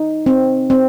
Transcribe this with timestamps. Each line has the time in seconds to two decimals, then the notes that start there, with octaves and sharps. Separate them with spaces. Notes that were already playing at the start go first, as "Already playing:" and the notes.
Already playing: D#4
0.26 C4
0.70 C4